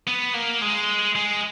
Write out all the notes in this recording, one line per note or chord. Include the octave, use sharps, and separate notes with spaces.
B3
A#3
G#3
G#3